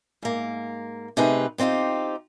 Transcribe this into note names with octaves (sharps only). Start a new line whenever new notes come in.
G#2 A#3
C3 A3 D#4 G#4 B4 G5
B3 C4 D#4 F4 G4